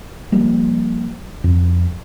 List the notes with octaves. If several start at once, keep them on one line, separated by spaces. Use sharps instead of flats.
F3 G3 A#3
F2